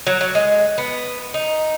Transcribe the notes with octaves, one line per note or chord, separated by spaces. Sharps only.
F#3
F#3
G#3
B3
D#4